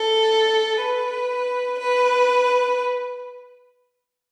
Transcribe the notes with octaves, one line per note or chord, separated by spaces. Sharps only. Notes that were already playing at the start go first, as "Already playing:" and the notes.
Already playing: A4
B4
B4